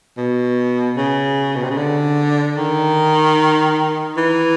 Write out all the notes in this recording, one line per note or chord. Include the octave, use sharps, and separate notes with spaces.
B2
C#3
B2
C3
C#3
D3
D#3
E3